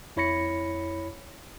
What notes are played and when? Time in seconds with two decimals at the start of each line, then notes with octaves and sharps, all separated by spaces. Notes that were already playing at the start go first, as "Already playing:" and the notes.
0.16 F2 E4 C#5 B5 A#6 C#7